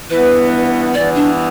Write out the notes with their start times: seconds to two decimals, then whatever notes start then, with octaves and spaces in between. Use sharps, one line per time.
0.10 G2 E3 B3 B4
0.94 G2 E3 B3 D5
1.15 D4